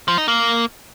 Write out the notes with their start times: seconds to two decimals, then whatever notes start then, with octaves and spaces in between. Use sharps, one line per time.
0.08 F3
0.18 D#4
0.28 A#3